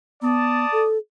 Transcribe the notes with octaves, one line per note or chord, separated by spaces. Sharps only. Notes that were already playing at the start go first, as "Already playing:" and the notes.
B3 D5 A5 D#6
A4